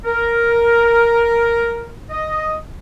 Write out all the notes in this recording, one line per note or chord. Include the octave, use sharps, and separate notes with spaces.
A#4
D#5